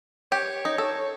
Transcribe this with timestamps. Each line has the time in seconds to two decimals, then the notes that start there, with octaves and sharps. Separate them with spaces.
0.32 G4 C#5
0.65 D#4
0.78 A4